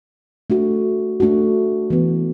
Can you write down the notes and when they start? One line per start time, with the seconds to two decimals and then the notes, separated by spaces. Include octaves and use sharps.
0.50 A3 D4 F#4
1.20 A3 D4 F#4
1.90 E3 B3 F#4